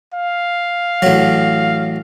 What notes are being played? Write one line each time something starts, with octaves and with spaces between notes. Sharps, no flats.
F5
A1 F#3